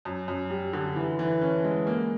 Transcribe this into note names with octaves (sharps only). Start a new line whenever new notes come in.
F#2
F#2
G3
D3
E3
E3
C#4
G#3
A#3